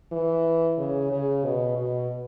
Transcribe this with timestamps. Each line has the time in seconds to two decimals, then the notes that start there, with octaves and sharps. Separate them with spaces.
0.12 E3
0.78 C#3
1.11 C#3
1.45 B2
1.78 B2